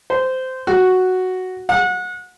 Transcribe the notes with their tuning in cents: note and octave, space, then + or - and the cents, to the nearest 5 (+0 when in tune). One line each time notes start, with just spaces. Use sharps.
C5 -15
F#4 +0
F#5 -30